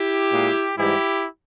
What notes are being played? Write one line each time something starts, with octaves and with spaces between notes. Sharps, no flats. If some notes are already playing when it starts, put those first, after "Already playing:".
Already playing: E4 G4
A#2 G#3
G#2 E3 G3 E4 G4